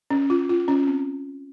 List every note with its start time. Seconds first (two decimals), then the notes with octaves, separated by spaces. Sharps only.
0.10 C#4
0.30 F4
0.49 F4
0.68 C#4
0.87 C4